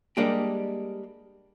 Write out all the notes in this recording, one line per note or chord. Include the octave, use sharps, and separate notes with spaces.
G3 G#3 A#3 D4 G4